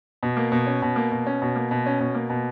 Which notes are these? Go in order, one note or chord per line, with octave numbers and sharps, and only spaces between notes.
B2
A#3
B2
C#4
B2
A#3
B2
C#4
B2
A#3
B2
C#4
B2
A#3
B2